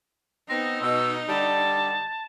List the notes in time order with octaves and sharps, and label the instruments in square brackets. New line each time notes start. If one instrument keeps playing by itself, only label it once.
[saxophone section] B3 C4 [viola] D#4 [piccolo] A#6
[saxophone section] B2 [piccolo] E6
[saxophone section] D3 G3 [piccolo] A5